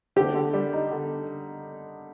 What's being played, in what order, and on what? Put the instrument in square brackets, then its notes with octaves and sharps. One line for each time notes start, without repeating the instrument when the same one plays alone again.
[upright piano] D3 [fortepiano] G4
[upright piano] D3
G3
D#4
D3